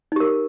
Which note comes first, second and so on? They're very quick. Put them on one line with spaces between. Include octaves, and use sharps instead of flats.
D#4 G4 A#4